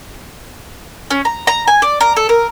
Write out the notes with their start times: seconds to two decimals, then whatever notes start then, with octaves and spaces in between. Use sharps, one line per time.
1.11 C#4
1.25 A#5
1.47 A#5
1.68 G#5
1.82 D5
2.01 A#4
2.17 A4
2.29 A#4